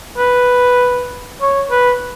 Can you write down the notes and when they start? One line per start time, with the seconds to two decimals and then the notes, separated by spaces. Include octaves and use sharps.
0.18 B4
1.41 C#5
1.71 B4